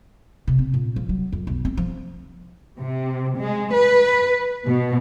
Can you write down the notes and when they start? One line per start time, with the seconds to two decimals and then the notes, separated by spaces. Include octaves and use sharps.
0.47 C3
0.59 C4
0.74 A#2
0.96 F3
1.09 F#3
1.32 F2
1.47 B1
1.65 C4
1.77 F3
2.79 C3
3.38 G#3
3.74 B4
4.66 B2